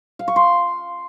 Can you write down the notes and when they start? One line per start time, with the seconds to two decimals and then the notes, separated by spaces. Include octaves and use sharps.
0.19 F5
0.28 C#6
0.36 C6